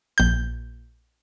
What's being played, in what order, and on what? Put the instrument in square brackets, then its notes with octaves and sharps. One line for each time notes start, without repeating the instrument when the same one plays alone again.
[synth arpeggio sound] A#1 G6